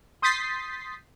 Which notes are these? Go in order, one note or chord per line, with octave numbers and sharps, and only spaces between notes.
C6 D#6 G6 A6 B6 C7